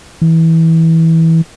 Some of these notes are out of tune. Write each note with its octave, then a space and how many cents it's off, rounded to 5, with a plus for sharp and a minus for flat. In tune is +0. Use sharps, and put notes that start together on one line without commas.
E3 -20